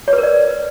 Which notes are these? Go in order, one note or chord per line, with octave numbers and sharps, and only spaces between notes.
C#5
B4
A#4
D5